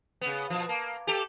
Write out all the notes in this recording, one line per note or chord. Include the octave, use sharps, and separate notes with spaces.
C#3 B3
B2 F3
A#3
G4 A4